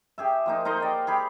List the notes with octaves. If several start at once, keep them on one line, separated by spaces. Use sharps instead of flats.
G4 G#4 E5
F3 A#3 D#4
D#4 A#4 C5 D#5
D5 G5
G4 G#4 B5